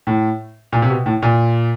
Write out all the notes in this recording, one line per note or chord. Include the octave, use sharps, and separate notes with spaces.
A2
A#2
C3
B2
A2
A#2